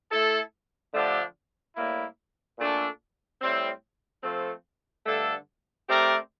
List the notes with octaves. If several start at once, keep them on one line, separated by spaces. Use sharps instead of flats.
A3 E4 A4
D3 F3 A3 D4 G4
A2 G3 A#3 E4
A#2 A3 D4 A4
A2 G3 C4
F3 A3 C4 F4 A4
G2 D3 A3 D4 A4
A3 C4 G4 A#4 D5